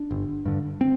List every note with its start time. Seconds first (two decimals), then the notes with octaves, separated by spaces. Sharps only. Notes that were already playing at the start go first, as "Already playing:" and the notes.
Already playing: D4
0.11 G1
0.46 G2 D3
0.81 C4